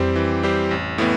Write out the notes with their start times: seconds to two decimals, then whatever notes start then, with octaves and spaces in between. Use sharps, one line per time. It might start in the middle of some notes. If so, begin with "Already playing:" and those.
Already playing: F2 E3 G3 C4 G4 C5
0.16 E3
0.43 G3 C4 G4 C5
0.71 A1
0.98 A2 E3 B3